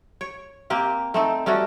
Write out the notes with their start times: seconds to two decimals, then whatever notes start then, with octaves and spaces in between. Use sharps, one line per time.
0.21 C#5
0.70 A#3 C4 G4
1.14 A3 C4 D#4
1.46 G3 A3 C#4 F#4